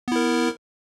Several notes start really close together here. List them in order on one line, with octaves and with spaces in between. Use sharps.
B3 E4 A#4